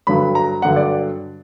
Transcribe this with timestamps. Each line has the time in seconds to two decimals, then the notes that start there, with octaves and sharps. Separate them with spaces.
0.07 G2 D3 F#3 B5
0.35 A#5
0.62 G2 D3 F#3 F#5
0.76 D5